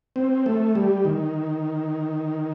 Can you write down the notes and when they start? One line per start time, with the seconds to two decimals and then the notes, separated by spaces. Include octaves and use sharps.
0.16 C4
0.46 A3
0.75 G3
1.05 D#3